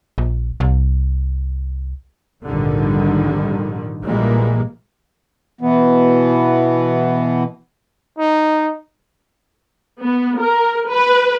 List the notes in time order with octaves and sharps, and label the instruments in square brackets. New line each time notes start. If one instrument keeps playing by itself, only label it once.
[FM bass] A#1
C2
[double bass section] A#1 F2 G#2 D3 D#3 G3
A#1 A#2 E3 G3 G#3 A#3
[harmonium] B2 E3 B3
[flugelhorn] D#4
[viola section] B3
A#4
B4